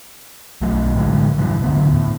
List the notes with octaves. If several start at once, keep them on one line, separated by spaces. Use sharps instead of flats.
B1 F#3 A3
A2 D3 G#3
G2 C3 E3 F#3
D1 D3 B3
A2